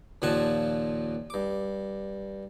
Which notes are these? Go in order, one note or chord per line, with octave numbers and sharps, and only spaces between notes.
D#2 A#2 F3 F#5 G#5 A5
G2 D6